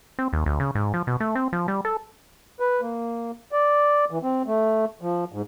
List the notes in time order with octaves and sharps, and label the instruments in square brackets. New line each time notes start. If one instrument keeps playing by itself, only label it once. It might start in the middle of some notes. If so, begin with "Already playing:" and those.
[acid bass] C4
D#2
D2
C#3
G#2
F3
B2
A3
C4
F3
G3
A4
[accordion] B4
A#3
D5
E3
C4
A3
F3
G#2